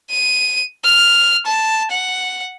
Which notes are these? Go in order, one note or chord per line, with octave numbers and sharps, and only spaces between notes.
D#7
F6
A5
F#5